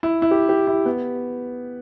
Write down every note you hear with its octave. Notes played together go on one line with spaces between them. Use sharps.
E4
E4
G4
G4
E4
B3